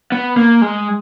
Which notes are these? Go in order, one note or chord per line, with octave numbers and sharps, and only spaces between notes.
B3
A#3
G#3